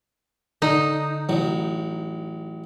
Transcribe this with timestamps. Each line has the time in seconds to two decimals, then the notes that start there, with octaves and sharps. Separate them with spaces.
0.62 D3 D#4
1.29 A1 F#3